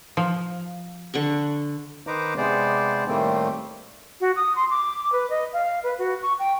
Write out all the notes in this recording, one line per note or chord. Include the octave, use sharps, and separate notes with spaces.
F3
D3 F#5 C#6
D#3 D#4 B4 C5 A#5 D6
C3 G#3 B3 C5 D5
A2 D#3 G3 A3 A#3 C4
F#4
D#6
C6
D6
B4
D#5
F5
B4
F#4
C#6
G5